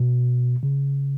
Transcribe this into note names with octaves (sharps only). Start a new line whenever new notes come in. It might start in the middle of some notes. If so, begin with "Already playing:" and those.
Already playing: B2
C#3